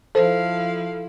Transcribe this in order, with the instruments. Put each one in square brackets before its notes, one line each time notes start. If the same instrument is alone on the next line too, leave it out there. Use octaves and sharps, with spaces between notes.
[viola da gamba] F3 E4 [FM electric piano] A4 [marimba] C5 [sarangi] F5